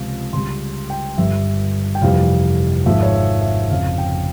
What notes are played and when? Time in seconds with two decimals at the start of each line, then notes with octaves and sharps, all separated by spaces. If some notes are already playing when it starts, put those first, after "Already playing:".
Already playing: C#2 C3 F3
0.33 C#2 C#3 G3 C6
0.90 G5
1.18 G1 G2 G3 E5
1.95 G5
2.02 F1 F2 C3 E3 G3 F5
2.86 G#1 G#2 F3 G#3 E5
3.02 C#5
3.14 E5
3.41 E5
3.70 F1 F2 C#3 F5
3.98 G5